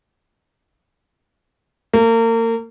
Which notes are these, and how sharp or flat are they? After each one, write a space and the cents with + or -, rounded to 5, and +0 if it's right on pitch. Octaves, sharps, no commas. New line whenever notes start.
A#3 -35